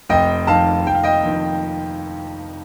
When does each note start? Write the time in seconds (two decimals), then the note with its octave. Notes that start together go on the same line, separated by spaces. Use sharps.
0.09 F1 D#5 G5
0.47 F2 D#3 F5 A5
0.86 F1 G5
0.95 F5
1.03 D#5 G5
1.24 F2 D#3